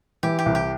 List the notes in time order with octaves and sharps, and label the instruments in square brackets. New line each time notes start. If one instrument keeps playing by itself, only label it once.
[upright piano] E3 [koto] G4
[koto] G4
[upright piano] C2
[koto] G4